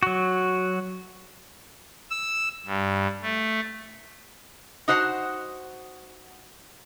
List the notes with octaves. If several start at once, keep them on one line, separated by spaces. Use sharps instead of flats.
F#3 F#4
E6
G2
A3
D#4 F#4 C5 F#5 A5